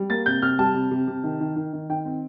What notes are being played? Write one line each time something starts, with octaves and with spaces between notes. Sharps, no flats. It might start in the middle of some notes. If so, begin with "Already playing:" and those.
Already playing: G3
A#3 A6
C3 G6
C3 F6
G3 A5
C3
C3
C3
D#3
D#3
D#3
D#3
D#3 G5
C4